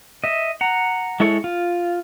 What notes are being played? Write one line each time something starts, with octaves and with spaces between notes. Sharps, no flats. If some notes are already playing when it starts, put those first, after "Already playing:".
D#5 E5
F#5 A#5
G#3 E4 A4 C#5
F4